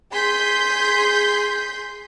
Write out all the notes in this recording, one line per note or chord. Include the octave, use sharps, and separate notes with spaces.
G#4 C6 G6 B6